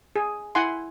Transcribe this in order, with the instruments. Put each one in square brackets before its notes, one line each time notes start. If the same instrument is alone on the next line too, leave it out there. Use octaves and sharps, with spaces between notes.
[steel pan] G#4
E4 F#5 G#5 C6